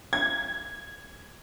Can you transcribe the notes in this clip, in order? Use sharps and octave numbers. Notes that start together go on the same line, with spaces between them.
G#6